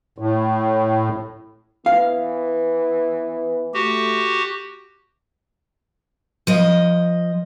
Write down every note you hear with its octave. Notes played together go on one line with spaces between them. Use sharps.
A2
E3 B3 F5
A3 F#4 G4
F3 D#5